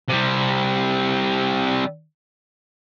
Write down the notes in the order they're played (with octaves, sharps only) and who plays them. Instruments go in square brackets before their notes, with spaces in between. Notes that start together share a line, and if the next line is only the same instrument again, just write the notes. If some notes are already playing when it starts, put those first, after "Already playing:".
[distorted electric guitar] C3 G3